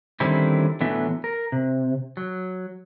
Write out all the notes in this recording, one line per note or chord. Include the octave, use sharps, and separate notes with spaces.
D3 D#3 G3 C4 C#4 E4
A2 D3 E3 F#3 B3 E5
A#4
C3
F#3